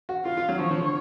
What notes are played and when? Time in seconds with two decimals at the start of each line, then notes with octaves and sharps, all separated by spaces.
0.09 F#4
0.25 F4 F5
0.37 F4
0.49 F#3
0.59 F3 C#5
0.71 F3
0.81 D3